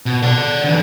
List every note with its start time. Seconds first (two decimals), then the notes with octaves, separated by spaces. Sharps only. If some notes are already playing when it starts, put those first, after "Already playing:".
0.06 B2
0.23 D5 F#5
0.64 D3 E3